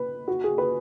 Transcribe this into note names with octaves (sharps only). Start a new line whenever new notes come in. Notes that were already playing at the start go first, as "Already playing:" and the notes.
Already playing: B4
F#4
G#4
B4